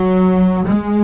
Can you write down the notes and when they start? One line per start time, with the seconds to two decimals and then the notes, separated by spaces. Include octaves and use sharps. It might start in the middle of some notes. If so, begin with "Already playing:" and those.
Already playing: F#3
0.66 G#3